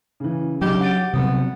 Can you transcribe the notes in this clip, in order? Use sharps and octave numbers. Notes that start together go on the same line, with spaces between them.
C#3 E3
C#3 F#3 D4 D#4 G4
F#5 A6 D7
C3 F#3 G3 B3